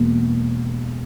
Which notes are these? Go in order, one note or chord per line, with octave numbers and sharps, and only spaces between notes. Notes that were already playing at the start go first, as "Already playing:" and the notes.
Already playing: E1 E2 B2 A#3